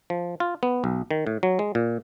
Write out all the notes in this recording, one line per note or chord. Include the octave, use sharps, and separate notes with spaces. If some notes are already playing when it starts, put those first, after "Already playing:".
F3
F4
B3
B1
D#3
A2
F#3
G#3
A#2